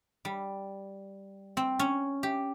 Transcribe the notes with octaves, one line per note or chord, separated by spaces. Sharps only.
G3
C4
C#4
G4